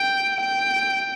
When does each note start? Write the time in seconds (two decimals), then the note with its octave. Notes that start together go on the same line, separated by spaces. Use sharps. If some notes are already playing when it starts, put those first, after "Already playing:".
Already playing: G5
0.42 G5